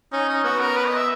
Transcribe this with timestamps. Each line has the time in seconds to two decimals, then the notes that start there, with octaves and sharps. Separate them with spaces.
0.13 C#4 D#4
0.29 D#4
0.44 B3 F#4
0.60 A#4
0.76 B4
0.87 D#5
0.97 E5